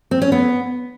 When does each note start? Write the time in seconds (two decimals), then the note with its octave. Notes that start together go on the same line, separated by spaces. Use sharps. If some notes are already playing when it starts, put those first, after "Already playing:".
0.11 C4
0.22 C#4
0.32 B3